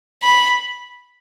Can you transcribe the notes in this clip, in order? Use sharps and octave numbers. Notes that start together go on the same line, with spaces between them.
B5